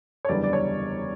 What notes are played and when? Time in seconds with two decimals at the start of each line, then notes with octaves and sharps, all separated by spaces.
0.25 C#5
0.29 F#1 E2 D3 G3 B3 D5
0.44 D5
0.53 C#5